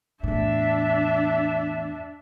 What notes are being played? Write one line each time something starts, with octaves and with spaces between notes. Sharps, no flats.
E2 A2 D4 E5